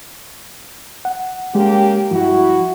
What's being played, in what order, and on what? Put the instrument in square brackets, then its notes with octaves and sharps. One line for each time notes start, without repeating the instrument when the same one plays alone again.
[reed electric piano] F#5
[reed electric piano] G#3 [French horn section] A#3 C#4 G4
[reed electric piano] G2 F3 [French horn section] E4 F#4